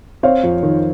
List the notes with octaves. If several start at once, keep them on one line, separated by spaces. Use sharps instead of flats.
C4 C#5 F5
F2
D#3